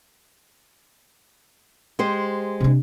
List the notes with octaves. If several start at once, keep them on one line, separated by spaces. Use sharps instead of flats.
G#3 G4 C5
C3 D4